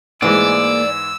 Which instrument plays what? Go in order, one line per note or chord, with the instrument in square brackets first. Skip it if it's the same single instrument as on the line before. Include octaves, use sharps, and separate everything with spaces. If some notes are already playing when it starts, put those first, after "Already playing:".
[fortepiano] G#2 E3 G#3 [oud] A#3 G#4 [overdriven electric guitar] D5 [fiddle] E6